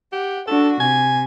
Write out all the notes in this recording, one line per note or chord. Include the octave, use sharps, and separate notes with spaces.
G4 F#5
D4 F#4 A4
C3 G#5